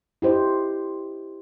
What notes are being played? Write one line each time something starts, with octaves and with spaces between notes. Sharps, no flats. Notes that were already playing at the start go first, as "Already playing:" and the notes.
E4 G4 C5 D#5